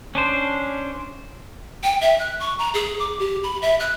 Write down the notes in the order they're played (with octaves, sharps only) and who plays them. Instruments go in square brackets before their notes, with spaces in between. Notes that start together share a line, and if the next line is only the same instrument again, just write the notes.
[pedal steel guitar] C#4 D4 C5
[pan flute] G5
E5
F#6
C#6
A#5
G#4
D6
G4
B5
E5
F#6